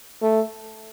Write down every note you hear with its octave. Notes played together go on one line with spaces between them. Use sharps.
A3